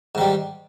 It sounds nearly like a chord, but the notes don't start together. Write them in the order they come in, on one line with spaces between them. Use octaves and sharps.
G#2 D#3 G3